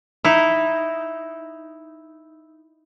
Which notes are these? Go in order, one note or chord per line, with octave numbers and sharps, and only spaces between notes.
D#4 E4